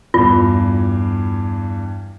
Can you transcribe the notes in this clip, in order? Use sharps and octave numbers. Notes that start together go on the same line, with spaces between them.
E2 G2 F4